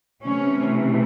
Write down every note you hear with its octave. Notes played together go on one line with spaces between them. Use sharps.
C3 E3 A3 C#4